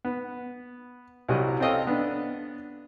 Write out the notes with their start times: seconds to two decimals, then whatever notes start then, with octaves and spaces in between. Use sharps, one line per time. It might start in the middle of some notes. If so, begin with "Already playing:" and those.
0.05 B3
1.29 C2 F#3 G3 D#5
1.60 C4 C#4 A4 D#5 F5 G5
1.87 B3 D4